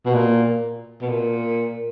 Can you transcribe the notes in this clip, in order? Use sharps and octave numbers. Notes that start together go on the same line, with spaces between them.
B2
A#2
B2
A#2